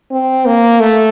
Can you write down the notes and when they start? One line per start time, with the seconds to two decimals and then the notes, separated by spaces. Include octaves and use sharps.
0.11 C4
0.46 A#3
0.80 A3